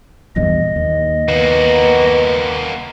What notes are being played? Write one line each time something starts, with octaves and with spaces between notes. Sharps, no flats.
A#1 E2 G2 D#5
D#2
A#3 B3 F#4